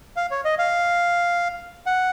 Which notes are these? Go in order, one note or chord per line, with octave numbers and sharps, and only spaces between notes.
F5
C#5
D#5
F5
F#5